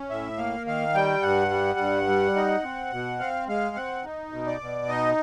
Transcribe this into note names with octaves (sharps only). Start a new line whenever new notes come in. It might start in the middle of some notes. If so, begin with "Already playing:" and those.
Already playing: C#4
A2 E5
A#3 F5
D#3 F5
G3 G5
G2 F#5
G3
G2
G3
D#4
C4
B2
C4 F5
G#3 F5
C4 F#5
D#4
B2
D5
B2
D#4 D#5